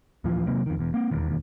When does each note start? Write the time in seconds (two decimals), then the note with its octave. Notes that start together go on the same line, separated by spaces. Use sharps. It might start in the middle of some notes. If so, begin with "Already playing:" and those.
0.24 D#1 A#2 E3 F3
0.47 C3 F#3 A#3 C4
0.66 F2 D#3
0.77 E1 E2
0.94 A#3 C4
1.11 E1 D#2